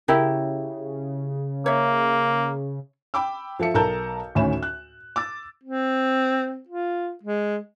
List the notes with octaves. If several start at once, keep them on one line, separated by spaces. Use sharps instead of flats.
C#3 E4 G4 A#4
A#3 C#5 E5
G5 B5 D6 E6
F3 A4 E5 C#7
B1 A4 A#4 A5 A#5 G6
D2 A2 D#3 C#4 B5 E7
F#6
D6 E6 A6
C4
F4
G#3